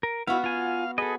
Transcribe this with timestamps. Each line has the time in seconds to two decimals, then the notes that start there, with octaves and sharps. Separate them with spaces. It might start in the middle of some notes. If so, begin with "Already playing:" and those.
0.03 A#4
0.27 B3 E4 F#4 F5
0.44 F4 F5 G#5
0.98 G#4 A4 B4 D#5